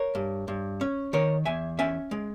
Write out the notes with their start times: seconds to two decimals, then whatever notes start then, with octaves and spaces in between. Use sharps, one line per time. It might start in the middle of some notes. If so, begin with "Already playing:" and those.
Already playing: A#4 C#5
0.15 G2
0.48 G2
0.81 C#4
1.13 D#3 A#4 C#5
1.45 E2 E5 G#5
1.79 C#4 E5 G#5
2.11 G#3